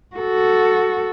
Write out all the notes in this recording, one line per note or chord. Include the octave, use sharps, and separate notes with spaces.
F#4 A4